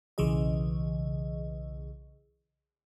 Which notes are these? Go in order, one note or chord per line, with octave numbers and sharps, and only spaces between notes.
B1 C#3 E3 G#4 D#5